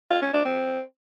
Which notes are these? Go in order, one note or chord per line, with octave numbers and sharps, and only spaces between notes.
F4
C#4
D4
C4